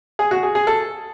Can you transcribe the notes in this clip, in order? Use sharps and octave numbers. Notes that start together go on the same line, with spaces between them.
G#4
F#4
G#4
G#4
A4